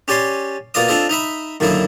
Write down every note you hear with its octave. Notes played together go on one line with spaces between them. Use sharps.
C#4 G4 D5 G#5 C6
B2 A#3 F4 D5 D#5 D#6
C4 D4 F4 A4 D#5
D#4 D#5 E5 B5
F#2 D3 D#3 A#3 E4 D#5